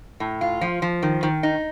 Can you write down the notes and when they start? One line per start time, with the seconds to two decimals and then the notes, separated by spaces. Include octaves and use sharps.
0.20 A2
0.41 F4
0.61 F3
0.82 F3
1.03 D#3
1.23 D#3
1.43 D#4